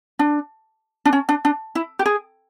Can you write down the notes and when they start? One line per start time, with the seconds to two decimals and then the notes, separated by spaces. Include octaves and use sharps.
0.19 D4
1.05 D4
1.13 C#4
1.29 D4
1.45 D4
1.75 E4
1.99 G4
2.06 G#4